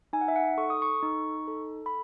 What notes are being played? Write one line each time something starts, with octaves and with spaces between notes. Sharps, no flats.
D#4 G#5
F#5
E5
F#5
A4 C#6
D#6
C#6
D#4
A4
B5